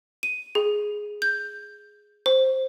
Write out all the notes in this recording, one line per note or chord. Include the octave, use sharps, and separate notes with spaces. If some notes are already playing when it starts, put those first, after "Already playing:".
D#7
G#4
G6
C5